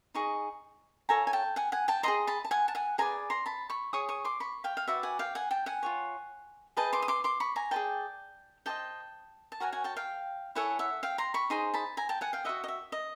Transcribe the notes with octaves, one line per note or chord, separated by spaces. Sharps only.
D#4 G#4 D#5 C#6
F4 A4 C#5 G#5 A#5
G#5
G5 A5
F#5 G#5
F#5 G#5
G5 A5
G#4 C5 D#5 A#5 C6
A5 B5
A5
F#5 G#5
A5
F#5 G#5
G#4 B4 D5 G#5 A#5
A#5 C6
A5 B5
B5 C#6
G#4 C#5 C#6 D#6
C#6 D#6
C6 D6
B5 C#6
F5 G5
F5
F#4 B4 D5 E5 F#5
F#5 G#5
F5 G5
F#5 G#5
G5 A5
F#5 G#5
F4 G#4 C#5
G#4 B4 D#5 G5 A5
C6 D6
D#6
C6 D6
C6 D6
B5 C#6
G#5 A#5
G#4 B4 D5 G5 A5
G4 C5 D#5 G5 A5
A5
F#4 A#4 C#5 F#5 G#5
F#5 G#5
G5 A5
F5 G5
E4 A4 C#5 F#5 G#5
E5 F#5
F5 G5
A#5 C6
B5 C#6
D#4 G#4 C5 C6
A5 B5
G#5 A#5
G5 A5
F#5 G#5
F5 G5
F#4 B4 D#5 E5 F#5
D#5
E5
D#5